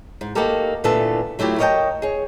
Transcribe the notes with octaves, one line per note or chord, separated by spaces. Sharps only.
G#2
A#3 D#4 F#4 G4 A4 A#4
A#2 D3 E3 A3 B3 A4
F#3 A3 E4 F4 G4
A#4 C#5 D#5 E5 G5 A5
G#4 C#5